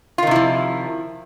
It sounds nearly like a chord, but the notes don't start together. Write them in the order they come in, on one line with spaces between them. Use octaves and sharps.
F4 D#3 C3 E4 F3